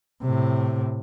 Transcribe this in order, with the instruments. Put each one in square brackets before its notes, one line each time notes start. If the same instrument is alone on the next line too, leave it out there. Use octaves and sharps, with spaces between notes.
[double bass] A2 C3